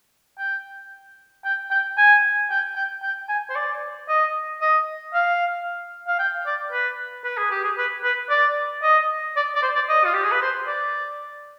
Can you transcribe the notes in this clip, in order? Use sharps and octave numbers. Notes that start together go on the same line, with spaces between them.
G5
G5
G5
G#5
G5
G5
G5
G#5
C5
D5
D#5
D#5
F5
F5
G5
D5
B4
B4
G#4
G4
G#4
B4
B4
D5
D#5
D5
D5
C5
D5
D#5
F4
G4
G#4
B4
C5
D5